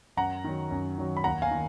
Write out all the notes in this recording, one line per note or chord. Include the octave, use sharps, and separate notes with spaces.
F#2 F#5 A#5
D#3 F#3
F#2
D#3 F#3
B5
D#2 F#5 A#5
F5 G#5
D#3